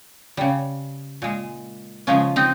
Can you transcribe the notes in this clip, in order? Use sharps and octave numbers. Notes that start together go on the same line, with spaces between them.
C#3 G3
A#2 G#3
C#3 F3 G#3 C#4 F4
C4 D#4